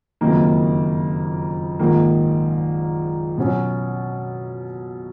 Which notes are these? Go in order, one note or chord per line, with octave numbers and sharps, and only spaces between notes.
F#1 F2 D#3 A#3
A#1 G#2 D#3 A#3
B2 F#3 C#4